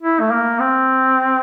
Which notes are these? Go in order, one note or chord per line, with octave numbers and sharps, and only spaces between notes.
E4
A3
A#3
C4